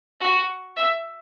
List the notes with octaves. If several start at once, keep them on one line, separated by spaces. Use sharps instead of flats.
F#4
E5